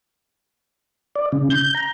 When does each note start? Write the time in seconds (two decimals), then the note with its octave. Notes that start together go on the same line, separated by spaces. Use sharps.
1.15 D5
1.32 C#3
1.50 G6
1.75 A#5